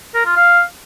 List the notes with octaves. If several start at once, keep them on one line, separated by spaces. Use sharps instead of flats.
A#4
F4
F5